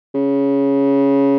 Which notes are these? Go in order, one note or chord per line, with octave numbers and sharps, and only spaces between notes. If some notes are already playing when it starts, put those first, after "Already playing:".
C#3